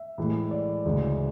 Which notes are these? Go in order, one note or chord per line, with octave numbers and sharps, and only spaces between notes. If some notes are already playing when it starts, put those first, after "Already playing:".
Already playing: E5
A2 E3 G#3
D5
D2 C#3 E3 G#3